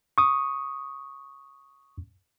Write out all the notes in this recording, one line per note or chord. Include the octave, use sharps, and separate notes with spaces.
C#6 D#6